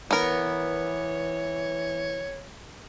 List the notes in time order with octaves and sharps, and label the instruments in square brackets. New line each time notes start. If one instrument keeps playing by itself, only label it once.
[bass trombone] E3 [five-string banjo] B3 A#4 [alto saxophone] C#5